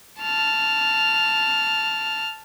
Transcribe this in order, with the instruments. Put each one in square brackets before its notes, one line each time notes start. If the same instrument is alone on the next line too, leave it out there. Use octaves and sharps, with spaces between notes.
[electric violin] A5 F6